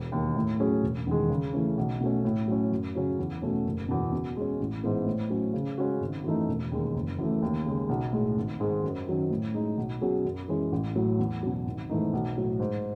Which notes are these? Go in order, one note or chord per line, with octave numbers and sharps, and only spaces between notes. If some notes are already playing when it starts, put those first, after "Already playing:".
Already playing: E1
D#2 D#3
A2
F#3 C#4 G#4
E1
E2 D#3 G#3
C#3
E3 A3 C#4
B1
B2 A3 C#4
A2
F#3 C#4
F#2
C#3 F#3 C#4
E2
B2 A3 C#4
F#1
E2 B2
B2
G#3 C#4
A1
G#2 E3 G#3 B3
A2
F#3 C#4
C#3
G#3 C#4 F#4
G#1
F#2 E3 A3 D#4
E1
D#2 D#3 G#3
F#1
F#2 E3 A3
D#2
C#3 G#3
B1
A2 G#3
G#1
G#2 D#3 G#3
F#2
D#3 F#3 C#4
A2
G#3 D#4
B1
B2 F#3 C#4 G#4
F#2
E3 G#3 C#4
A1
A2 F#3
E2
B2 F#3
G#1
G#2 E3 A3 D#4
B1
A2 F#3
G#2